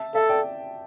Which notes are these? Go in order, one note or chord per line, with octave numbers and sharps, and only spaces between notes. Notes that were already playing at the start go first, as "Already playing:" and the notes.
Already playing: E5 A5
A4 E5
D5 G5